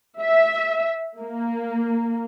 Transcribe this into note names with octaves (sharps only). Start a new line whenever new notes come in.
E5
A#3